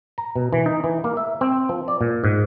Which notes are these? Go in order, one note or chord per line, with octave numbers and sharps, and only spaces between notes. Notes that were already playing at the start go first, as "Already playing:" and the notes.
A#5
B2
E3
D#4
E3
A#3
E5
C4
F3
D5
A#2
G#2